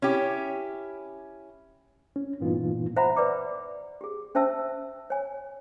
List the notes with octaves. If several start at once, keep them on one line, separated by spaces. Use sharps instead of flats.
C#4 E4 G4
C#4
G2 A#2 E3 B3 D#4 F4
C5 E5 F#5 A#5 B5
B4 D5 D6
G4 G#4
C#4 C5 E5 A5 E6
C#5 G#5